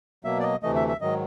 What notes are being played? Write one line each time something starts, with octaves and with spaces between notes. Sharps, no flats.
B2 F#3 A#3 E5
D5
D#5
D2 C3 E3 A3 D#5
E5
E5
G#2 D#3 F#3 D#5